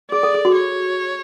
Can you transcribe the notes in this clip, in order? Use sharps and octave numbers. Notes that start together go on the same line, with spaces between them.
G#4 D5
A4
G#4
F#4
C#5